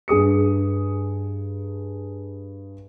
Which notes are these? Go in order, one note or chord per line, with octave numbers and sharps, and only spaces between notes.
G2 G#4 D#6 C#7